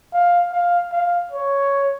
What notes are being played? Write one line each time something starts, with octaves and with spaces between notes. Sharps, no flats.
F5
F5
F5
C#5